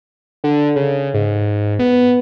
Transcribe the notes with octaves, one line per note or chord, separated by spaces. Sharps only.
D3
C#3
G#2
B3